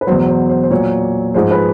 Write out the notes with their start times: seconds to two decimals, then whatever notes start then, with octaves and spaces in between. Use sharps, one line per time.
0.01 B4
0.07 E2 B2 F#3 C5
0.28 C5
0.50 C5
0.63 C5
0.70 A#2 F#3 C#5
1.34 G#2 F3 G#3 C5
1.51 B4